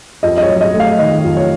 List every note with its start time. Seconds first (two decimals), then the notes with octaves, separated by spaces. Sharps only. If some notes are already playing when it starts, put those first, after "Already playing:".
0.23 F2 D#5
0.38 D#5
0.43 C#5
0.48 F#3
0.61 D#5
0.74 A3
0.80 F5
0.99 D#3 D#5
1.24 F2
1.37 C#5